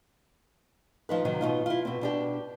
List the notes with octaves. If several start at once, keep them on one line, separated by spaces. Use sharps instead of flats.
F3 D#4 B4
C3 D#3 F#3
B2 D#4 F4
E4 F4
B2 C4
B2 D4 G4